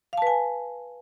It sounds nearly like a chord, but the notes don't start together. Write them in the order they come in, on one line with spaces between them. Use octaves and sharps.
F5 A5 B4 G#5